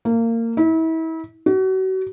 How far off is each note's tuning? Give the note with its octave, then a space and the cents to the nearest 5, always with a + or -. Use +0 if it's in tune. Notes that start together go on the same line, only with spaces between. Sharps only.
A#3 -25
E4 -35
F#4 +35